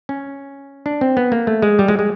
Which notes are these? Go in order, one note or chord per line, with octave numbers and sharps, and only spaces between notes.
C#4
D4
C4
B3
A#3
A3
G#3
G3
G#3
G#3